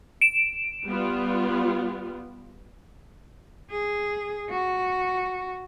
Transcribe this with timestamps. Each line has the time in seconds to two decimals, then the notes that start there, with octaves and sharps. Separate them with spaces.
0.21 D7 E7
0.86 G3 B3 F4
3.71 G#4
4.50 F#4